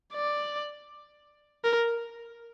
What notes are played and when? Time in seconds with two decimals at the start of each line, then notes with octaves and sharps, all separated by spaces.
0.13 D5
1.64 A#4